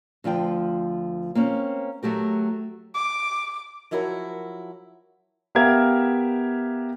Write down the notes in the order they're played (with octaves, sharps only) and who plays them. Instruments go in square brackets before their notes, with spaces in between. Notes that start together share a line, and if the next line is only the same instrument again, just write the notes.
[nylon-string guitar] D2 F3 F4 G5
A#3 C4 C#4
F#3 A3 G4 A#4
[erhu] D6
[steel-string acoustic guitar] F3 F#3 E4 F#4 A#4
[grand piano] B3 G4 A#4 E5 F5 G#6